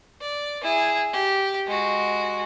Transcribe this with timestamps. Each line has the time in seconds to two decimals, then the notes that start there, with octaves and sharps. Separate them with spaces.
0.21 D5
0.62 E4 G#4
1.13 G4
1.67 G#3 F#4